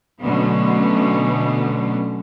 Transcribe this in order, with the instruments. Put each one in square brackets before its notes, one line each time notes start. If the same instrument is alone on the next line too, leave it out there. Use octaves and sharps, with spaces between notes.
[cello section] B2 D3 F#3 A3 B3 C#4